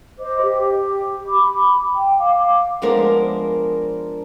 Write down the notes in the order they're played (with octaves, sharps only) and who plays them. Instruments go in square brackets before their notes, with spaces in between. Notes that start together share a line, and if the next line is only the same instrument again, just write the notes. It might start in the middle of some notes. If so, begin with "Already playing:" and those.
[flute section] C5 D#5 D6
G4
B5 D6
G5
F5 D6
[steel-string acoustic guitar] F3 G#3 B3 D4 A#4 C5